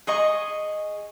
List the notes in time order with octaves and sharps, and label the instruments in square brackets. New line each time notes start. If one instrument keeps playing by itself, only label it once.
[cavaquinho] G#4 D#5 C#6